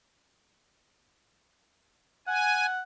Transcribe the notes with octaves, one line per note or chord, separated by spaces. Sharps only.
F#5 G#5